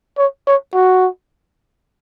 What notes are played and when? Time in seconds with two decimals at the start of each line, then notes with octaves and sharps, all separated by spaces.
0.18 C#5
0.47 C#5
0.74 F#4